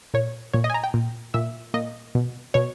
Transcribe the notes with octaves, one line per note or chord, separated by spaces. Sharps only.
A#2 C#5
A#2 C#5
D#5
G#5
A#5
G5
A#2
A#2 E5
A#2 D#5
B2
B2 C#5